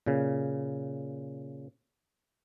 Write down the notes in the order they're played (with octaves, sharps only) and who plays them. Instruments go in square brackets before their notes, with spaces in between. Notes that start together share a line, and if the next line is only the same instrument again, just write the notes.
[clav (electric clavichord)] A#2 C#3